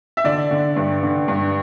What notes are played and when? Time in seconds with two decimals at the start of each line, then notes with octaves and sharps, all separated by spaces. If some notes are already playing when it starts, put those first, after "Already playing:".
0.17 E5
0.24 D3 D4 D5
0.51 D3
0.76 G2
1.03 D3
1.28 G2